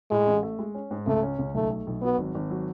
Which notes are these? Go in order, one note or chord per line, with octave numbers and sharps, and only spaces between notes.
A2 G#3
A1
A3
G#3
C#4
G#2
C#2 A3
C#4
C#2
B1 A3
A3
B1
F#3 B3
G#1
G#1
F#3